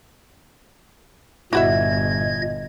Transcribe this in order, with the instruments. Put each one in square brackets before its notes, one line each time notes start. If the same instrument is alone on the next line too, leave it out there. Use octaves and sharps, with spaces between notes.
[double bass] G1 [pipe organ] A#2 D#5 G#6 [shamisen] E4 F#4 E5